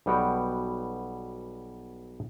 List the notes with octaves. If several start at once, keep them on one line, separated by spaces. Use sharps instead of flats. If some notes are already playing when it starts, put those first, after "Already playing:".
B1 G3 B3 F#4 G5